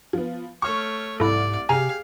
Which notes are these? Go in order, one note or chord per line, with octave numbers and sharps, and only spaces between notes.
F3 B3
A3 C#5 C#6 F6
C2 G#2 E4 A4 D5
C3 G4 G#4 F5 G#5 A#5